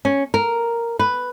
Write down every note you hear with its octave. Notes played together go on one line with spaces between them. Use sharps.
C#4
A#4
B4